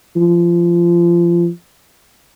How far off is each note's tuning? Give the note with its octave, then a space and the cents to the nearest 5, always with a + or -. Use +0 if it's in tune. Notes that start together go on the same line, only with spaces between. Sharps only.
F3 -25